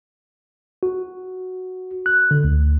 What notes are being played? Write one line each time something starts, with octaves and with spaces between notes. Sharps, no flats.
F#4
F#6
D3
D2